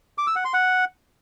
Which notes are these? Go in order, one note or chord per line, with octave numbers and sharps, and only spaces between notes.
D6
E6
F#5
C6
F#5